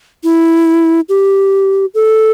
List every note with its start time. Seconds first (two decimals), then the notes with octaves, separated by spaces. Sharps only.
0.24 E4
1.09 G4
1.95 A4